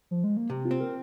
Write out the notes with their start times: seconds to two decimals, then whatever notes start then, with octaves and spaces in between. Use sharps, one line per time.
0.11 F3
0.24 G#3
0.37 A#3
0.50 C3 C4
0.65 F4
0.71 C4
0.80 A#4